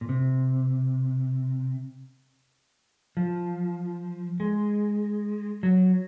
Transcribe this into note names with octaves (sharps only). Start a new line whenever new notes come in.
A#2
C3
F3
G#3
F#3